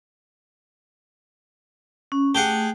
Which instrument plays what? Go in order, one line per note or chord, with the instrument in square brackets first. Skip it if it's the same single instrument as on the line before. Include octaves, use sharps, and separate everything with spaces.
[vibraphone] C#4
[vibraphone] A3 [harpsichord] G4 G#4 F#5